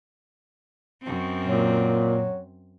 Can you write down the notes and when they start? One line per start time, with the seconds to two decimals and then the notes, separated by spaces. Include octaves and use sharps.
1.02 F#2 C4
1.48 A#2 F#3